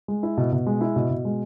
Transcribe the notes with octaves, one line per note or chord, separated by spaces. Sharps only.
G#3
E4
B2
B2
G#3
E4
B2
B2
G#3